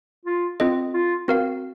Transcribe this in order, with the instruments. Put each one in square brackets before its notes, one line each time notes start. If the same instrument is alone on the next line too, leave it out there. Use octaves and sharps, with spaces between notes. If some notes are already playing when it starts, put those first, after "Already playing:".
[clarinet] F4
[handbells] C4 F4 A4 D#5
[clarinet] F4
[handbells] C4 F#4 A#4 F5